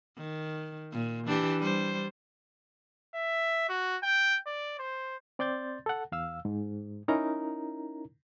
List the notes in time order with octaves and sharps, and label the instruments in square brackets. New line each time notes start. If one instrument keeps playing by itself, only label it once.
[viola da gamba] D#3
A#2
E3 D4 G4
G3 C5
[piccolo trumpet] E5
F#4
G5
D5
C5
[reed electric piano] C4 D5 C6 G6 A6
A4 F#5
E2 F5 E6
G#2
C#4 D#4 E4 A#4 A#5